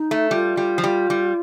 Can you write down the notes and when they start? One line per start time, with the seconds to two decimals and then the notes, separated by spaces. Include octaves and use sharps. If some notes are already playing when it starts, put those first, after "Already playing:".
Already playing: D#4
0.11 A3
0.31 G3 F4
0.57 G3
0.78 F3
0.84 G3
1.10 G3